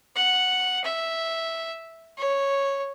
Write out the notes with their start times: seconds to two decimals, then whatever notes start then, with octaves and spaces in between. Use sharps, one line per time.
0.16 F#5
0.84 E5
2.18 C#5